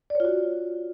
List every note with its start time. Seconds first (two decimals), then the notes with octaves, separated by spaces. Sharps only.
0.10 D5
0.15 C#5
0.20 F4
0.25 F#4